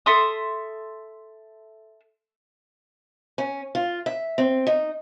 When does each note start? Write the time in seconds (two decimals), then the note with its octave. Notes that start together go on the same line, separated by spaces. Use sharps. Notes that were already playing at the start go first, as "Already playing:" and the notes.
0.06 A4 E5 C6 D#6
3.38 C#4
3.75 F4
4.06 E5
4.38 C4
4.67 D#4